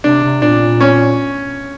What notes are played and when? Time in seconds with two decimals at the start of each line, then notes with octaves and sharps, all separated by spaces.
0.04 C3 D4
0.24 C3
0.42 A#2 D4
0.81 C#4